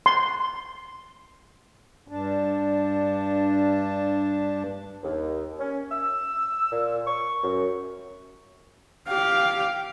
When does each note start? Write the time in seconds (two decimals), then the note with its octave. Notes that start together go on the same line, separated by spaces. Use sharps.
0.06 C6
2.08 G2 D4
5.04 D#2
5.59 C#4
5.92 E6
6.72 A#2
7.06 C#6
7.43 F#2
9.08 G4 F5